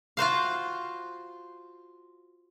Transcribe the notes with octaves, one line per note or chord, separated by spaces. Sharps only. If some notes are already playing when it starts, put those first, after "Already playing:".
F4 F#4 C5 F5